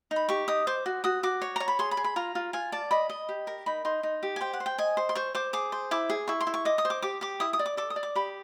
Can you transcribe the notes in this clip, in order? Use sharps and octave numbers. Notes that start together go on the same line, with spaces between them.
D#4
B5
G4 C#6
D#4 D#6
C5 D6
F#4
F#4 D#6
F#4 D6
C#5
C#5 A#5
B5
G#4 C6
B5
G#4
B5
F4 A#5
F4
F4 G#5
D5 A5
D#5 B5
D#5
G4
A#4
D#4 B5
D#4 C6
D#4
G4
G#5
C5 G5
F#5
C5
G5
D#5 G#5
C5
C6
C5 C#6
C5 D6
G#4 D6
C5
E4 D6
G#4
E4 C#6
C6
E4
C#6
D#5 D6
D#6
C5
D6
G4 D6
G4 D6
E4 D#6
D#6
D5
D6
A4 D6
D#6
D5
D6
G4 B5